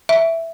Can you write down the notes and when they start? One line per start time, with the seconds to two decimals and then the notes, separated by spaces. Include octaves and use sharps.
0.09 E5